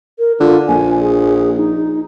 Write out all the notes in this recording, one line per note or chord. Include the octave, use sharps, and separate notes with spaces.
A#4
D3 F4
A#1 G#5
G#4
D#4